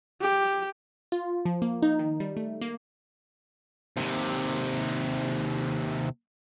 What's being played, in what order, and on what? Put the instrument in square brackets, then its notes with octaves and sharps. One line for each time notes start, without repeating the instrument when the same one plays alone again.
[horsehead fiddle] G4
[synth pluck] F4
F3
A#3
D#4
D#3
G3
A3
A#3
[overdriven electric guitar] D#2 C3